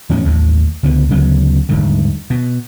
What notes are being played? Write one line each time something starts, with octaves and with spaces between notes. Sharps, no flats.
E2 A2 D#3 C#4
A1 D#2 A2
C#2 D3 B3
D2 C#3 F#3 B3
D#1 A#1 G#2 D3
B2